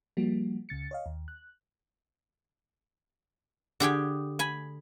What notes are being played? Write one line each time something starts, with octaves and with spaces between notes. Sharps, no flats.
F3 G3 A#3 F#4
C#2 C#3 A6 C#7
C#5 D#5 F5
D#2
F#6
D3 G4 G#4 G5
G#5 B5